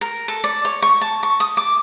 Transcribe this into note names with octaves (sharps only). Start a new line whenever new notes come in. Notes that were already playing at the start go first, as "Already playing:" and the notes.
A#4
A4
D5
C#5
C#6
A5
C#6
D#6
D6